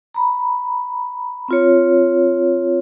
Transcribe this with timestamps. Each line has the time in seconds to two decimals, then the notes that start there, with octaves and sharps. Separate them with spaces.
0.14 A#5 B5
1.48 C4 F4 C#5